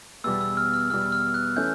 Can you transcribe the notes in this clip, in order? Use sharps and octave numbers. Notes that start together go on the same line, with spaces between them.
E2 B2 G3 E6
E6
F6
F6
E2 B2 G3 F6
F6
F#6
E3 A3 C#4 G6